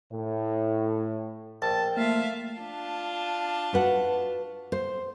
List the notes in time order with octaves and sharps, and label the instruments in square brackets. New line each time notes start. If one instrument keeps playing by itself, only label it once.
[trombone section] A2
[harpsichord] A#1 [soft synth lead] G5 [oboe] A5
[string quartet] A3 E5 F5 [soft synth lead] A#3 [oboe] F4
[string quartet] D4 F4 A5
[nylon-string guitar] F#4 B4 F#5
C5